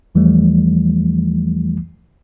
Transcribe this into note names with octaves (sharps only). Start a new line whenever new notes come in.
E2 E3 F3 G3 A3